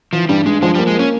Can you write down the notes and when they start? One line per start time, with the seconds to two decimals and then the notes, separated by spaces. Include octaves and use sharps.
0.13 E3 F3
0.29 G2 G3
0.46 G2 G#3
0.62 F3 G#3
0.75 G3
0.78 A#3
0.87 G#3
0.95 A#3 C#4